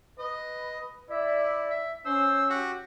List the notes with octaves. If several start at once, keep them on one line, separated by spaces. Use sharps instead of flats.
B4 D#5
E4 D5 E5
E5
C#4 C5 E6
F#4 G4